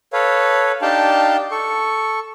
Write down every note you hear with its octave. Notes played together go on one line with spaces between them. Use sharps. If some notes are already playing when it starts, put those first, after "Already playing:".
A4 B4 C#5 F5
D4 D#4 G4 F5 G5 A5
A4 C#6